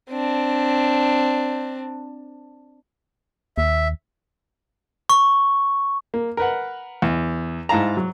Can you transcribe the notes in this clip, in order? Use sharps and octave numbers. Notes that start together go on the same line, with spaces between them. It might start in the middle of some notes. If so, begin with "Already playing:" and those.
C4 D4
D#2 E5
C#6
A#3
A#4 B4 F#5
E2
G#2 E4 F5 A5 A#5
F#3